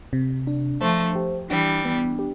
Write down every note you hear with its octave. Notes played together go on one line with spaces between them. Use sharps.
C3
D4
F3 A3 C5
G4
E3 G3 D4
B3
G4